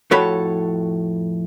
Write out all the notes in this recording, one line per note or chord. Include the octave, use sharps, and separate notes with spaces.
F2 A2 F#4 A4 C#5 B5